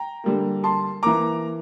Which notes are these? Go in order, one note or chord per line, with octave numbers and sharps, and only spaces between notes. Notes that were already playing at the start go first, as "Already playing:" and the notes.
Already playing: G5 A#5
D3 G3 A#3
A5 C6
E3 A#3 A#5 D6